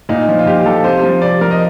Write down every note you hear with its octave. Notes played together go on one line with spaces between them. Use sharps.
A#2 D#4
F3
F4
A#2 G4
F3 A4
C3 C5
F3
C3 D5
F3 A#4
D#5